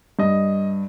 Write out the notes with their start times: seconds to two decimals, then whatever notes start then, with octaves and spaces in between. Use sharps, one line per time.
0.19 G2 D#5